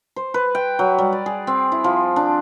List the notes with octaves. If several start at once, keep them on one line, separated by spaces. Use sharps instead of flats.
C5
B4
G5
F#3
G3
D5
G#4
C4
E4
F3
D4